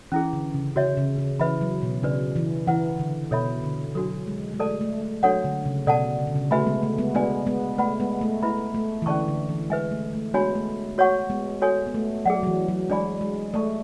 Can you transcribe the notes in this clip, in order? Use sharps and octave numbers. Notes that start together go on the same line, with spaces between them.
E3 C#4 E4 G#4
D3
C#3
C#3 F#4 C#5 E5
C#3
C#3
E3 B4 E5 B5
F#3
B2
C#3 D4 F#4 B4 D5
E3
E3 E4 B4 F#5
D3
B2 A4 C#5 E5 B5
D3
F#3 D4 F#4 A4
G#3
G#3
A3 A4 D5 A5
A3
A3
F#3 D4 F#4 A4 C#5 F#5
D3
C#3
B2 A4 D5 F#5 A5
C#3
D3
C#3
A3 F#4 B4 E5 G#5 B5
G#3 B3
A3
G#3 B3
G#3 B3 D4 F#4 B4 D5 G#5
G#3 B3
A3 B4 D5 F#5 B5
G#3 B3
A3
A3 E4 B4 E5 B5
A3
E3
D3 C#4 G#4 D5 A5 C#6
D3
E3
G#3 B4 E5 G#5
A3
A3
G#3 B3 D4 F#4 C#5 G#5 B5
A3
F#4 C#5 F#5 C#6
G#3 B3
F#4 A4 C#5 G#5
B3
A3
F#3 G#4 D5 F#5
F#3
E3
F#3
G#3 D4 G#4 D5 G#5 B5
G#3
A3 A4 D5 A5 C#6